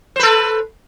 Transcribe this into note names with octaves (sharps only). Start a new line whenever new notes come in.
A4 B4 C5